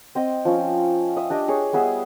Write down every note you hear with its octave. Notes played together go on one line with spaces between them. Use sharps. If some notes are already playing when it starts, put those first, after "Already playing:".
C4 D#5 G5
F3 C#4
E5 D#6
D4 G4 D#5
G#4 C#5
G3 B3 G#4 E5